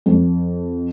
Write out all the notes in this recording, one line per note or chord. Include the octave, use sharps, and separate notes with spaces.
F2